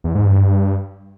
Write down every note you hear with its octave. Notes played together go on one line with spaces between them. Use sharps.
E2
G#2
G2